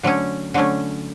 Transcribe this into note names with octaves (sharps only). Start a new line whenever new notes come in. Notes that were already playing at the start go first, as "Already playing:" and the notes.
D3 F#3 A3 C#4
D3 F#3 A3 C#4